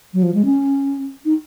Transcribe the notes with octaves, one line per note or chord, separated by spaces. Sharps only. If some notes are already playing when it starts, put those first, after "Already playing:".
F#3
F3
G#3
C#4
D#4